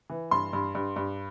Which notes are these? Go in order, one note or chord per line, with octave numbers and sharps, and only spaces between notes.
E3
G2 C6
G2
G2
G2